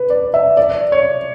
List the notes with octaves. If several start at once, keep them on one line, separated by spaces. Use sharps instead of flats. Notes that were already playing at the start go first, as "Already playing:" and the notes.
Already playing: B4
D5
E5
D5
C#5